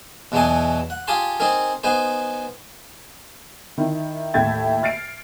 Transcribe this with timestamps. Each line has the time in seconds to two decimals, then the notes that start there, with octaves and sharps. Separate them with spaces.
0.32 E2 B2 E3 F#3 G#4 A5
0.90 F#5
1.08 F4 G4 G#4 A5 C6
1.40 C4 D#4 G#4 A#4
1.84 B3 D#4 G#4 C5
3.78 D#3 E4
4.34 D#2 A2 E5 G5 G#6 A6
4.83 F6 A6 C7 D7